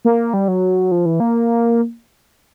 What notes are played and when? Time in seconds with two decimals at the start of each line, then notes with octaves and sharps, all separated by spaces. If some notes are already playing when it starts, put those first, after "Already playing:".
0.05 A#3
0.34 G3
0.48 F#3
0.91 F3
1.06 E3
1.20 A#3